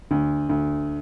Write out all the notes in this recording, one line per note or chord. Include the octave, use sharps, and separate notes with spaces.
D2
D2